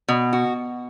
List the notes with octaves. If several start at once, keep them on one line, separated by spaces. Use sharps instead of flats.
B2
F#4